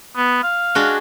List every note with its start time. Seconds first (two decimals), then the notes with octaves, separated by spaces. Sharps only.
0.16 B3
0.43 F5
0.75 G#3 D4 F#4